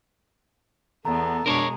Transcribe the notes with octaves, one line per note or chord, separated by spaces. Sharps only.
E2 B3 A4 A#5
B2 G#3 D4 A#4 C5 C#5